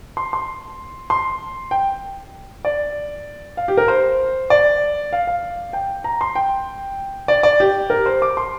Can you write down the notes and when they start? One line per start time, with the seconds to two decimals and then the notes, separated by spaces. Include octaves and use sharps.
0.17 C6
0.33 C6
1.10 C6
1.71 G5
2.65 D5
3.57 F5
3.68 G4
3.77 A#4
3.88 C5
4.50 D5
5.13 F5
5.27 F5
5.73 G5
6.04 A#5
6.21 C6
6.36 G5
7.28 D5
7.43 D5
7.60 G4
7.90 A#4
8.06 C5
8.22 D6
8.37 C6